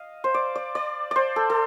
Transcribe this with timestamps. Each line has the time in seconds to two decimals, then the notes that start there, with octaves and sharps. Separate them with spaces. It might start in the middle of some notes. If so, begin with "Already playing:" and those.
Already playing: D#5 F5
0.24 C5
0.34 D5
0.55 D5
0.75 D5
1.11 C5 D5
1.36 A4
1.50 A4